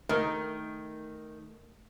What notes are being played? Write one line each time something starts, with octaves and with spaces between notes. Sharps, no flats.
D#3 A3 A#4